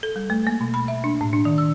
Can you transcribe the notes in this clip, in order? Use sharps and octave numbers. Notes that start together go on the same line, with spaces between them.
A4
G3
A3
A#3
B2
B5
E5
D4
A2
D4
D#3
E6